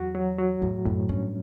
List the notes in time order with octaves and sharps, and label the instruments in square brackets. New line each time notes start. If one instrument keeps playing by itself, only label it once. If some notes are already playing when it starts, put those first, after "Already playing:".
Already playing: [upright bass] E2 [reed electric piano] F#3 F#4
[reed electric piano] F#3
F#3
[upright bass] E2 [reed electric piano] A2
[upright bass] F#2 [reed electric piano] A2
[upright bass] G2 [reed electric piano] C#4